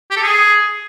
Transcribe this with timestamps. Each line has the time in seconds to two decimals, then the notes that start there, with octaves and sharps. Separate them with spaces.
0.11 G4
0.16 A4
0.22 G#4